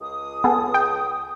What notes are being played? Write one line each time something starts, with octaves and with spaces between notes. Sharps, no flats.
C#2 D#6
B3 G#4 A4
G5